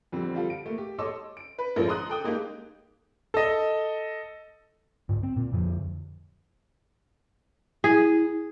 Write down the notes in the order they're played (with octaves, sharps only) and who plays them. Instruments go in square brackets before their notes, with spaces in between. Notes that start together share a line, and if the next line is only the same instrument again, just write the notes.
[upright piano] F2 D3 G3 C4
F3 G3 F4 A4
D7
A3 A#3
G4
A4 C#5 D#5 C6 D6 E6
[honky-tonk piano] D7
B4
A1 D3 F3 G#3 A#4
A#5 C6 D#6 F#6
A4 G5 D#6
G#3 A#3 D#4 G4
[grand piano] A4 D#5
[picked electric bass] G#2 D3
C4
A#2
F2 D3 F3
[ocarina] E4 [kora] G#4